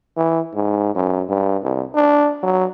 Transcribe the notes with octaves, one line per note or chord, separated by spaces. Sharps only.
E3
G#2
F#2
G2
C2
D4
F#3